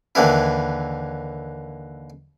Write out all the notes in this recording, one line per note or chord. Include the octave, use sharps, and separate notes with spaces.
D#2 D3 E3 E4